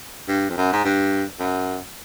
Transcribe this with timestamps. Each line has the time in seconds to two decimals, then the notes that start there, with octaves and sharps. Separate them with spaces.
0.28 G2
0.49 F2
0.57 F#2
0.72 G#2
0.84 G2
1.39 F#2